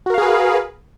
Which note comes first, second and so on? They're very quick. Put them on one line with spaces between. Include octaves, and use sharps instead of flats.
F#4 A#4 F5 G#4 B4